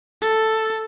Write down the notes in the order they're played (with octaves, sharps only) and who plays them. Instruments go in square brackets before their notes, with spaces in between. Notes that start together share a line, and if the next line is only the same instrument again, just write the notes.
[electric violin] A4